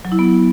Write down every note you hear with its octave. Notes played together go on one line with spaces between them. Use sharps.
F#3
E4
B3